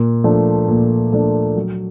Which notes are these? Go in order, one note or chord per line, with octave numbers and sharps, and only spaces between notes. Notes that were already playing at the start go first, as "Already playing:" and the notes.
Already playing: A#2
F3 A3 D4
A#2
F3 A3 D4
F#3